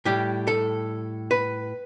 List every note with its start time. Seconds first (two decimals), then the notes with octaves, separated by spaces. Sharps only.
0.05 A2 G3 G4
0.47 A4
1.31 B4